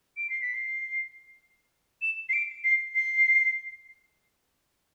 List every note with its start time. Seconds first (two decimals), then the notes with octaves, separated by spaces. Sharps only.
0.17 D7
0.30 C7
0.42 B6
0.55 C7
2.02 E7
2.29 C7
2.33 D7
2.64 C7
2.95 C7